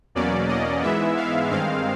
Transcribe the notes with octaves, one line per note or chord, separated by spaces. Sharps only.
E2 B2 F#3 A#3 C#4 D5
D#5
G#2 E3 G#3 B3 E4 E5
F5
G2 D#3 G#3 C4 F5